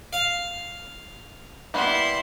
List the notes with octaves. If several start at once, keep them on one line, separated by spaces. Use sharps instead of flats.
F5
G3 A#3 B3 E4 C6